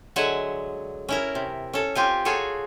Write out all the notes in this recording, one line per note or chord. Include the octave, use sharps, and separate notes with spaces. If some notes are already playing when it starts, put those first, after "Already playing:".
D3 F#3 G#3 E5 F#5 G#5
C#4 E4 A#4
C3
C#4 A4
C4 F4 G4 G#5
F4 F#4 G#4 A4 C#5 G#5